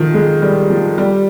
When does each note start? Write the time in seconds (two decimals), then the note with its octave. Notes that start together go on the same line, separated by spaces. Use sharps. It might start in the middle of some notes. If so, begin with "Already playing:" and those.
Already playing: D#3 F3
0.14 G#3
0.42 G3
0.70 F3
0.98 G3